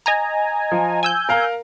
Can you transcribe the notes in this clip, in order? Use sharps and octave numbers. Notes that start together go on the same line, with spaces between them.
D#5 G#5 A#5
F3
G#5 E6 G6
A#4 F5 A#5